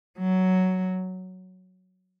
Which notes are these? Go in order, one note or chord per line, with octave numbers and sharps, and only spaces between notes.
F#3